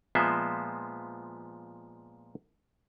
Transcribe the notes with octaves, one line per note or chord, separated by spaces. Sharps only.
A#2 F3 G#3 B3 C5 E5